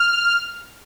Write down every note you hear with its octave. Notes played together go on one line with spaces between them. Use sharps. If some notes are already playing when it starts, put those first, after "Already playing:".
Already playing: F6